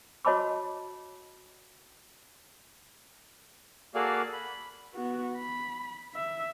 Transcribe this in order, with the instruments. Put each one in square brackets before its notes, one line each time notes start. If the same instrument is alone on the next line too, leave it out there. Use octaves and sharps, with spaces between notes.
[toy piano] F#4 C#5 D#5 A5 B5 D6
[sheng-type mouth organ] A#3 F#4 G#4 A4 D5 F5
B5
[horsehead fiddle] B3 F#4
B5
E5